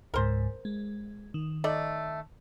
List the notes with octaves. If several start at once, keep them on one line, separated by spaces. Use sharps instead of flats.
C#2 G#2 A#4 C5
G#3
D#3
A3 D#4 D5